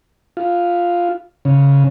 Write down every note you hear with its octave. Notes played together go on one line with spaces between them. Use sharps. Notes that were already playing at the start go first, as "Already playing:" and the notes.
F4
C#3